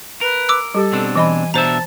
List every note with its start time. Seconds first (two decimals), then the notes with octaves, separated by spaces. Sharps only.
0.21 A#4 B4
0.49 D6 E6
0.75 G3 G4 A4
0.92 B2 C4 D4
1.16 E3 D#5 G#5 B5
1.54 B2 D4 C5 E5 A5 A#5